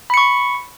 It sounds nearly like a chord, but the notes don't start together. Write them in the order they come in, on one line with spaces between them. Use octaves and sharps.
B5 C#7 C#6